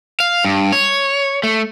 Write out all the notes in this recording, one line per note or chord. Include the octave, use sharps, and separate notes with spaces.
F5
G2
C#5
A3